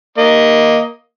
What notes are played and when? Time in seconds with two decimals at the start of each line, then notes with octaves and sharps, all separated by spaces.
0.18 A#3 D#5